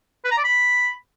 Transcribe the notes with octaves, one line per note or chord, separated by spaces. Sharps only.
B4
A#5
D5
B5